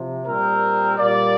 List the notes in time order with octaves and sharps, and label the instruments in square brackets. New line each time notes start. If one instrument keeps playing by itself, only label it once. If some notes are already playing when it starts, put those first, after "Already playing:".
Already playing: [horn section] C3 F3
A#2 G3 C4 A#4
A#2 G3 A#3 D5